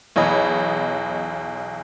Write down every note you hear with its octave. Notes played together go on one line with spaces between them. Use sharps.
B1 E2 C#5 D#5 B5